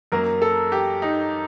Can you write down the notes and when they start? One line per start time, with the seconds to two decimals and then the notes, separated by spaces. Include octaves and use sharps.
0.12 F#2 F#3 A#3 A#4
0.42 A4
0.72 G4
1.02 D#4